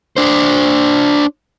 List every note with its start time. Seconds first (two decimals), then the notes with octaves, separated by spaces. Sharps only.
0.17 D4 C5